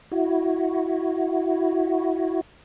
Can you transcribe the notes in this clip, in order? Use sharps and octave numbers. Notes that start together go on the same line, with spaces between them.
E4 F#4